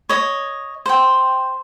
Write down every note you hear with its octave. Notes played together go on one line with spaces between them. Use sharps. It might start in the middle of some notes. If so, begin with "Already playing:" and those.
C#5 D#5
C5 G5